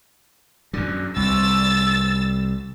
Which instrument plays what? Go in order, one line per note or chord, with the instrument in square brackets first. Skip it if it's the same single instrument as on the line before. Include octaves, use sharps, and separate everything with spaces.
[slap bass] F#2 D3
[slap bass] C2 [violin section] E6 A6